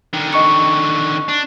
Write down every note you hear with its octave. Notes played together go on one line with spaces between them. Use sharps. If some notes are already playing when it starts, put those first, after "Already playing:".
D3 D#3
D#5 C#6 C#7
D4